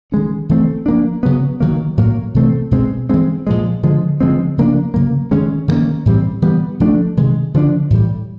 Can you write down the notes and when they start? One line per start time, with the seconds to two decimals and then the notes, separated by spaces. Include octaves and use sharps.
0.12 D#3 G#3 C#4
0.49 E3 A3 C4
0.86 F3 A#3 D4
1.23 C#3 F#3 B3
1.60 D#3 F#3 A#3
1.97 A2 F#3 A#3
2.34 C3 E3 A3 C4
2.71 B2 G#3 C4
3.09 E3 G#3 C4
3.47 A#2 F3 G#3
3.83 D3 F3 G#3
4.21 D3 F3 G#3 C4
4.58 C#3 F3 A#3 D4
4.94 C#3 F#3 A#3
5.31 D#3 G#3 C#4
5.68 D#3 G3 A#3 C#4
6.06 A2 E3 G3 C4
6.42 E3 G3 B3
6.80 F3 A3 D4
7.17 C3 D#3 G#3
7.54 D3 F3 A3 D4
7.90 A2 E3 G3